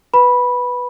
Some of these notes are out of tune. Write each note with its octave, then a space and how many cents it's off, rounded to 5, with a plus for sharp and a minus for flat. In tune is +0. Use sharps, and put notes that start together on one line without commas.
B4 +0 B5 -10